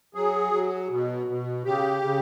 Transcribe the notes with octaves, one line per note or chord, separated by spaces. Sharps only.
F#3 G#4
F#3
B2
B2
C#3 G4
C#3